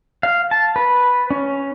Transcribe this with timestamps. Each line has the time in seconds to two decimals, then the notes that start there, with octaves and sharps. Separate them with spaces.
0.23 F5
0.51 A5
0.76 B4
1.31 C#4